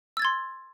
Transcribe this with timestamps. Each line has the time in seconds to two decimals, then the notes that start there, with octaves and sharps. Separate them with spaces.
0.17 E6
0.19 A6
0.22 G#6
0.25 C6